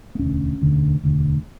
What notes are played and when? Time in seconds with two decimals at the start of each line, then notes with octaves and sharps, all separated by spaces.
0.15 B3
0.19 E1 D2 D3 C#4
0.61 E1 D2 D3
1.03 E1 D2 D3